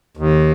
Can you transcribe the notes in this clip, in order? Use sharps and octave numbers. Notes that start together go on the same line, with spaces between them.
D#2